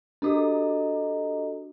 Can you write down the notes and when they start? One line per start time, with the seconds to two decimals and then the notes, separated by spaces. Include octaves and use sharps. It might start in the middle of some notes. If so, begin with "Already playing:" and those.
0.22 D4 F#4 G4 A4 D#5 A#5